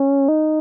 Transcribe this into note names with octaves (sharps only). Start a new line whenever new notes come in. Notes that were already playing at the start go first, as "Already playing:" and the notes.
Already playing: C#4
D#4